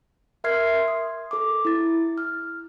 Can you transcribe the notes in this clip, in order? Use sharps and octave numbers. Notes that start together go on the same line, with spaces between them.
A#4 E5 C6 F6 G#6 C7
D#6
A4 D6
E4 A6
F6